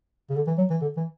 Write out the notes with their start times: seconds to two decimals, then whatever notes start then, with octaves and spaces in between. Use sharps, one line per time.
0.30 C#3
0.36 D3
0.47 E3
0.58 F#3
0.70 E3
0.82 D3
0.97 E3